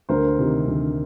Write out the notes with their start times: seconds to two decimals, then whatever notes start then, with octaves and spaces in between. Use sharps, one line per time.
0.09 D2 A#4 C5
0.39 C3 D#3
0.68 D2